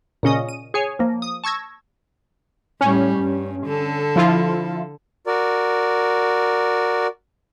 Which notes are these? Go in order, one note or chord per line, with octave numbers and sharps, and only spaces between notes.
A#2 C#3 C#4 D#5 D#6
D#7
G#4 C#5 G#5
F3 A#3
D#6
A5 C#6 E6 G#6 A#6
A2 G3 C#4
G2
D3 A4
F3 E4 F4
F#4 A#4 D5